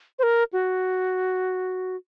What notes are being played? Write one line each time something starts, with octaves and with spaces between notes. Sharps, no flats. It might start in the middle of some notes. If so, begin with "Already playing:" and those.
C5
A#4
F#4